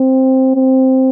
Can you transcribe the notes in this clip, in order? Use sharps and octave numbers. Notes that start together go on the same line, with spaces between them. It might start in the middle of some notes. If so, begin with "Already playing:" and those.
Already playing: C4
C4